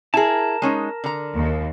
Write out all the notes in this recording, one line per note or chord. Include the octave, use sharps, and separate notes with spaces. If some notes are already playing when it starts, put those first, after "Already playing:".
E4 G#4 A#4 A5
G#3 C#4 D#4
D3 A#5
D#2